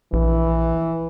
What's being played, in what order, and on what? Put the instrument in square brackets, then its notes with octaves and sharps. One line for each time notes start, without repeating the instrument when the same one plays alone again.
[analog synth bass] A#1 [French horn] E3